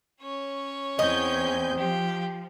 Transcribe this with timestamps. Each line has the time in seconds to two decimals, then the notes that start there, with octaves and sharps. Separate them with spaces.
0.21 C#4 C#5
0.99 E2 C4 D#5 G#5 G6
1.78 F3 G4